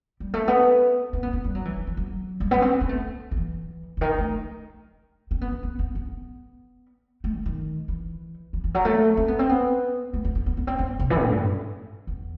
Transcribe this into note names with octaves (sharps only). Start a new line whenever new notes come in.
G3
A3
B3
C4
B3
B3
G3
F#3
E3
E3
E3
F#3
G3
B3
C4
B3
A3
D#3
E3
C3
D#3
A3
C4
B3
B3
B3
B3
B3
A3
D#3
D#3
E3
E3
E3
F#3
A3
C4
B3
C4
B3
A3
B3
B3
B3
B3
C4
B3
C3
E3
A2
G2
E2